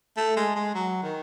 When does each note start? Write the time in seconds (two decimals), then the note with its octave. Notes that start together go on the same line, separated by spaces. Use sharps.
0.17 A3
0.36 G#3
0.56 G#3
0.75 F#3
1.03 D#3